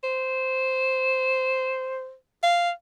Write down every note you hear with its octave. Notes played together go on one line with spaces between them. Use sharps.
C5
F5